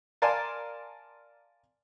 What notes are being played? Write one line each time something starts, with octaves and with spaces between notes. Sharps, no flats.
A#4 D5 F5 G#5 A5 C6